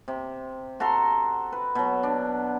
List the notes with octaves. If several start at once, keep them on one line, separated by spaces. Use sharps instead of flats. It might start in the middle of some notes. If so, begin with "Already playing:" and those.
C3
F#4 A4 A#5 C6
B4
B2 F#3
D4